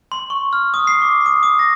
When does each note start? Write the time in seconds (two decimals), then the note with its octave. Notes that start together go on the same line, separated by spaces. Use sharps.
0.12 C6
0.30 C#6
0.53 F6
0.74 D#6
0.87 C7
1.02 D6
1.26 D#6
1.43 D#6
1.59 A#6